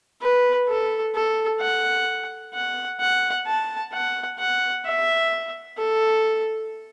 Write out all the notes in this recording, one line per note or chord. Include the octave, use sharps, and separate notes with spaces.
B4
A4
A4
F#5
F#5
F#5
A5
F#5
F#5
E5
A4